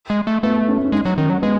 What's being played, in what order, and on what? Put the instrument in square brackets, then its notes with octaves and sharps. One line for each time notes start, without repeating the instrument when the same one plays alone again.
[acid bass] G#3
A3
[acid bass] A3 [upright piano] B3
[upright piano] C#4
C#4
[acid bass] G#3 [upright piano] D#4
[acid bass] F#3
[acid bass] D#3 [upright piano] C#4
[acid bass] F#3
[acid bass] G#3 [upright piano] B3